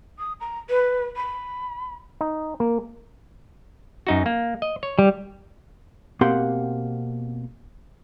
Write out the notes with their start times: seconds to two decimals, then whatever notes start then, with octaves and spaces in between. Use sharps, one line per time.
0.19 D#6
0.40 A#5
0.70 B4
1.16 B5
2.21 D#4
2.60 A#3
4.07 F#2 D#4 F#4
4.26 A#3
4.62 D#5
4.83 C#5
4.99 G3
6.21 B2 A#3 C4 G4 F#5 C6